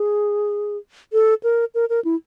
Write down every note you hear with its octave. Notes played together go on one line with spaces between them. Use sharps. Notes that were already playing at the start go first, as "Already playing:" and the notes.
Already playing: G#4
A4
A#4
A#4
A#4
E4